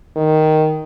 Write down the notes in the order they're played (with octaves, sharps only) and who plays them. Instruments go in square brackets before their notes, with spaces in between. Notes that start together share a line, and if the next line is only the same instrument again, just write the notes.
[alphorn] D#3